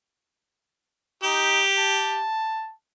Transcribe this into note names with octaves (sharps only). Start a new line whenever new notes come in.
D#4 G4
A5